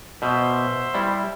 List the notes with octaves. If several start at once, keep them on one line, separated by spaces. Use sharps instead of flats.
B2 C5 E5
G3 E4